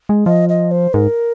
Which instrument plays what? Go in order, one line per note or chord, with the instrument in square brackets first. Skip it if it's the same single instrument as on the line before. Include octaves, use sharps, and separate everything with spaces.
[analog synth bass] G#3
[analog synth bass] F3 [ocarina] D#5
[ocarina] D#5
C5
[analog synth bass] G#2 [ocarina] A#4